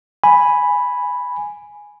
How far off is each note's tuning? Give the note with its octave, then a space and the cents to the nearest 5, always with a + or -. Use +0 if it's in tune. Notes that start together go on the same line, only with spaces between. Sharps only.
G#5 +0 B5 +0